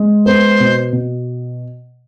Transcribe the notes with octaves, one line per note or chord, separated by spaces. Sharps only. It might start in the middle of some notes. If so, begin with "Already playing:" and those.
Already playing: G#3
B3 C5
B2
B2